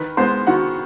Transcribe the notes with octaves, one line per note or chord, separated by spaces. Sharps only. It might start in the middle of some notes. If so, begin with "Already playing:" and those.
Already playing: D#3 B4 B5
G#3 B3 C5 C6
D#3 F#4 F#5